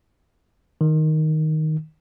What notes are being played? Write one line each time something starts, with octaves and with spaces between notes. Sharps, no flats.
D#3